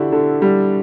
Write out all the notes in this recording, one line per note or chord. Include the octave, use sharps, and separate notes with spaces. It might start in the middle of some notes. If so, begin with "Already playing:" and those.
Already playing: D3 D4 E4 F#4 G4
D3
G3